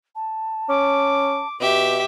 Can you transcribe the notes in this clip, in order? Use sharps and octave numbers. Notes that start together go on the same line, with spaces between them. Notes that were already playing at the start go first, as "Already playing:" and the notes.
A5
C#4 D6
B2 G4 E5